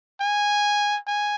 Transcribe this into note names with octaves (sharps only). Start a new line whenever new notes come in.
G#5
G#5